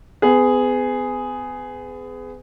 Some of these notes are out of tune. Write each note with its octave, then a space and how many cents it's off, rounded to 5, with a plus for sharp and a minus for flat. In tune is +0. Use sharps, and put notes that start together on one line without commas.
B3 +35 G#4 +0